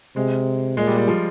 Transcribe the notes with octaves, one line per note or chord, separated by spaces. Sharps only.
C3 G#3
A#2 G#3
G3
G3
F3